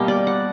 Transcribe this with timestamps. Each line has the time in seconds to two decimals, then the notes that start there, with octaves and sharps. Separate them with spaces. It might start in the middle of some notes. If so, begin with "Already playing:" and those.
Already playing: B2 G3 A#3 G4
0.08 D5
0.27 F#5